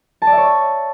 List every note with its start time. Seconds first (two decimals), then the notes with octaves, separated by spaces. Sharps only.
0.22 A5
0.27 D5
0.32 E5
0.37 C#5